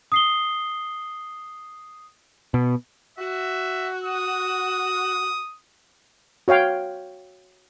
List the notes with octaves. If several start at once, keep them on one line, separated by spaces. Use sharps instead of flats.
D#6 C7 G7
B2
F#4 E5
D#6
F#4 C#5 F5 G5